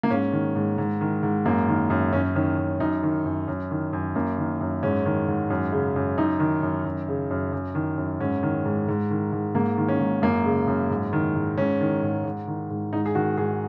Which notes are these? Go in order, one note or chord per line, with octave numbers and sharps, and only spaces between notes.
A#3
G#2 C#4
D#3
G#2
G#2
D#3
G#2
F#2 A#3
D#3
F#2
F#2 C#4
D#3 C#4
F#2
F#2 D#4
D#3
F#2
F#2
D#3
F#2
F#2 A#3
D#3
F#2
G#2 C#4
D#3
G#2
F#2
C#3
F#2
F#2 D#4
D#3
F#2
F#2
C#3
F#2
F#2
D#3
F#2
G#2 C#4
D#3
G#2
G#2
D#3
G#2
G#2 A#3
D#3
C#4
G#2
F#2 A#3
C#3
F#2
G#2
D#3
G#2
G#2 C#4
D#3
G#2
G#2
D#3
G#2
G#2 D#4
G#4
D#3 F#4
G#2 G#4